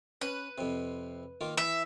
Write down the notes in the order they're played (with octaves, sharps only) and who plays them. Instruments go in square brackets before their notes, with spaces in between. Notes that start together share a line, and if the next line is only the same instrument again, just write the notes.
[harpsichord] C#4 [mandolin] B4
[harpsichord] F2 C3
D#3 A#3 F4
[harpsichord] E3 [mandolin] E5